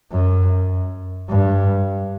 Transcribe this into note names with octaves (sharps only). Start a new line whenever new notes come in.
F#2
G2